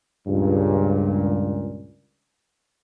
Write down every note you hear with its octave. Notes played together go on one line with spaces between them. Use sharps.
C#2 G2 A#2